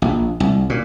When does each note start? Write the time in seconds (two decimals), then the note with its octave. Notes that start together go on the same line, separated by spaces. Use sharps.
0.02 A#1
0.40 C2
0.70 A#2